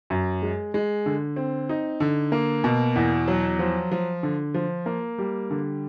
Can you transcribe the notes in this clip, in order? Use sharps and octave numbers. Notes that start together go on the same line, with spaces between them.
F#2
G#3
G#3
D3
C4
D#4
D3
A#3
B2
E2
F#3
F3
F3
D3
F3
A#3
G3
D3